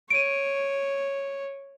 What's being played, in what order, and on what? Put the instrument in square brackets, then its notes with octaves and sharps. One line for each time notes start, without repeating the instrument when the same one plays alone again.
[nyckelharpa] C#5 [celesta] D7 D#7